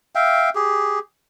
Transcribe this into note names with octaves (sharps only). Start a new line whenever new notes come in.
E5 F5 G5
G4 G#4